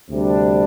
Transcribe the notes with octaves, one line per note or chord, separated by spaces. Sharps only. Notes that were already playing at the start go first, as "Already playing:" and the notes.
D2 C3 G3 D4